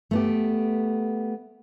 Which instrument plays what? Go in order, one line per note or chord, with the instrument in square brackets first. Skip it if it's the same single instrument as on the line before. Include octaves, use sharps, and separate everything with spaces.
[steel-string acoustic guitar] A3 B3 G4